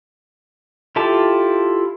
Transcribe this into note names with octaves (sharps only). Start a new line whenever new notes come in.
E4 F4 G4 A4 A5